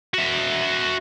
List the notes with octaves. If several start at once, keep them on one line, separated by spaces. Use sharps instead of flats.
F#4 E5